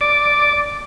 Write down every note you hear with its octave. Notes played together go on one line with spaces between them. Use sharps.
D5